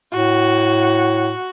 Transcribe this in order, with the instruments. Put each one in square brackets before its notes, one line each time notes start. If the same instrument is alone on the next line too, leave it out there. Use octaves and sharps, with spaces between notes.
[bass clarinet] A2 [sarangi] F#4